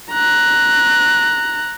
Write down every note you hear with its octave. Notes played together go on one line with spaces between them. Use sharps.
A#5 F#6